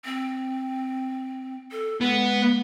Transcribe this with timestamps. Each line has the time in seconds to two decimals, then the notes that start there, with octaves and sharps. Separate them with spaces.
0.05 C4
1.71 A4
2.01 G#3 B3